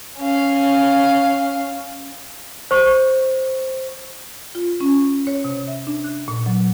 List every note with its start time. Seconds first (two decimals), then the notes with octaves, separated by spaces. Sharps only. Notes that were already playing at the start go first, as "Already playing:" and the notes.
0.19 C#4 F5
2.71 C5 C#6
4.55 F4
4.81 C#4
5.27 C#5
5.44 C3
5.67 E5
5.87 D4
6.04 F#6
6.28 A#2
6.46 F#3